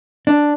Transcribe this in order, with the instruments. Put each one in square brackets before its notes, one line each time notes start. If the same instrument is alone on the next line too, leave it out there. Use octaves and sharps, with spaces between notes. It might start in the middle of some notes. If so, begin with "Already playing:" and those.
[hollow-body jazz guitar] D4